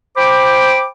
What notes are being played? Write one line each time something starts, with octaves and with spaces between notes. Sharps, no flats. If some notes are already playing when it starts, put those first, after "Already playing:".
C5 G5 B5 D6